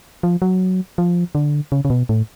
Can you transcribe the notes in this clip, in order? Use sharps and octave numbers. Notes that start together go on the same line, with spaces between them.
F3
F#3
F3
D3
C#3
C#3
B2
A2